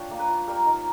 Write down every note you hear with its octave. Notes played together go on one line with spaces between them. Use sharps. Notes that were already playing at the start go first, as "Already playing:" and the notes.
Already playing: D4 F4 C#5 G5
A#3
B4
F4
G3 A#4
D#4 A#4